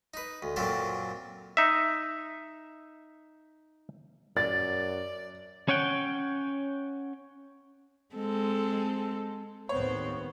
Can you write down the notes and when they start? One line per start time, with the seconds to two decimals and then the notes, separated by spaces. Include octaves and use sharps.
0.14 D#4 B4
0.42 D2
0.56 F#2 A#2 F#3 C4 A4 A5
1.57 D#4 E5
4.37 F#2 D5 A6
5.68 C#4 C#5 F#5 G5
8.15 G#3 C4 A4
9.69 D#2 A2 B3 C4 C5 C#5